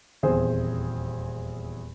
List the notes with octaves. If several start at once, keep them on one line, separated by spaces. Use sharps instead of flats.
D#1 E2 C4 G#4 C5